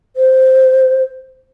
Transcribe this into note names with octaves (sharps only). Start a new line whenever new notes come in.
C5